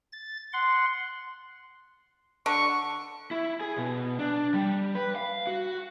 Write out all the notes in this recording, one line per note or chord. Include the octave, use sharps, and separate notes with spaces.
A6
F#5 C6
D3 C#6
E4
G#4
B2
D4
G3
B4
F5
F#4